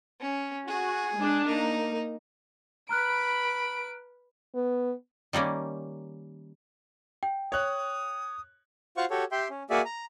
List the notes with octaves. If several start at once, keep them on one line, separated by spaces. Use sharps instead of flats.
C#4
F#4 G#4
G#3 D4
A#3 D#4
B4 A#5 B5 F6 F#6 D7
B3
D#3 G3 A#3 C#4
G5
C#5 D#6 F#6
F4 F#4 C5 F5 F#5 C#6
F#4 G4 A4 C#5
G4 E5 G5 C6
C#4
A#3 F#4 G#4 D5 E5
A#5